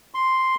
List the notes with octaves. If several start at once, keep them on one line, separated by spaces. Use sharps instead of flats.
C6